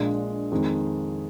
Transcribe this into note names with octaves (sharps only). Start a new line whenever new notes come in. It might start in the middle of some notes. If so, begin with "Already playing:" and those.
Already playing: A#1 A#2 G#3 D4
F2 D#3 G#3